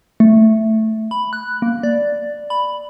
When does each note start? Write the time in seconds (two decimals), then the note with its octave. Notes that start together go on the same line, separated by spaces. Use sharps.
0.20 A3
1.11 B5
1.33 F#6
1.62 A#3
1.83 D5
2.50 B5